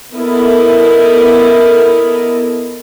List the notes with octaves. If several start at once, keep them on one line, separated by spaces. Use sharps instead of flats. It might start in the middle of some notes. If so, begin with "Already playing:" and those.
B3 E4 A4 A#4 D#5